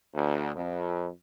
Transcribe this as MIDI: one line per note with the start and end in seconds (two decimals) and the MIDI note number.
0.14 0.50 38
0.55 1.07 41